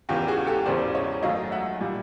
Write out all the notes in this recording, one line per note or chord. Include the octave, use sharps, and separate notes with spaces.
E2 C#3 E3 F4 G4
F#4 G#4
G4 A4
E1 E2 C#3 E3 C5 D5
C#5 D#5
F#2 D#3 F#3 A3 D#5 F5
E5 F#5
A#2 G3